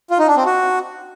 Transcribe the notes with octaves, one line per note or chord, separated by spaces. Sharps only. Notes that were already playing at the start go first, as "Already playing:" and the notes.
F4
D#4
D4
C4
F#4